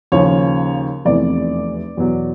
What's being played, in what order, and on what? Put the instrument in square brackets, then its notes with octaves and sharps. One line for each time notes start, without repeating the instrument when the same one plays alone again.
[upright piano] D#2 C#3 F3 C#5
F1 E2 C3 E3 A3 D5
E2 B2 F#3